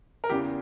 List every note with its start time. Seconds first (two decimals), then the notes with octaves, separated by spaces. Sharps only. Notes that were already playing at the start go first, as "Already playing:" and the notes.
0.24 A#4
0.29 E2 C#3 E3 G4